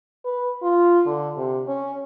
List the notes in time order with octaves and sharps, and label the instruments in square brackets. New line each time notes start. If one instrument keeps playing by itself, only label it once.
[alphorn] B4
F4
D3
C3
C#4